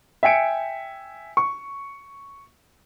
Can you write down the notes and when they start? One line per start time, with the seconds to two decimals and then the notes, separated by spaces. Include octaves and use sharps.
0.23 E5 G5 G#5 C#7 D7
1.37 C#6